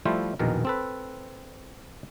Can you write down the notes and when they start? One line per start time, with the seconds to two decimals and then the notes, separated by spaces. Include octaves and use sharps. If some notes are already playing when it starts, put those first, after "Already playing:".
0.05 F3 G3 A3 E4 F4 C5
0.39 A#1 E2 B2 D#3 A#4
0.65 C4 A4 B4